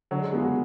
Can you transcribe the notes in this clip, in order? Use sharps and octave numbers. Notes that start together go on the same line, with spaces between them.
D3 F#3
G#3
G#3 B3 F4
F#4